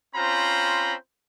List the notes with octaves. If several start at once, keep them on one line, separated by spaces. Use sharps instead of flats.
C4 C#4 F4 C5 A#5 B5